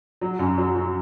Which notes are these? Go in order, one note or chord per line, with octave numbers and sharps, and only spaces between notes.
F#3
F#2
F#3
F#3